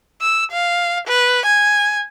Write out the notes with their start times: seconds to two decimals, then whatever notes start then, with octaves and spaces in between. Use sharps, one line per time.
0.21 E6
0.52 F5
1.07 B4
1.45 G#5